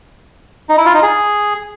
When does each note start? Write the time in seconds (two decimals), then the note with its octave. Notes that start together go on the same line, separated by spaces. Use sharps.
0.69 D#4
0.78 E4
0.86 F4
0.94 D#4
1.03 G#4